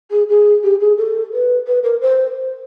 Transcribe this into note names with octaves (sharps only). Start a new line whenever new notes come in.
G#4
G#4
G4
G#4
A4
B4
B4
A#4
C5